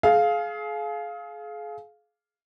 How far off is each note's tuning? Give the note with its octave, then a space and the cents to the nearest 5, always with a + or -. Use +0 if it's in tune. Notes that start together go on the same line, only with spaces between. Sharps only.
G#4 +35 F5 +0